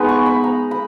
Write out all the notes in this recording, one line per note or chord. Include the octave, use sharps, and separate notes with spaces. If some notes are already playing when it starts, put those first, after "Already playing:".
Already playing: G#3 B3 D#4 B5
C#6
B5
A#5
B5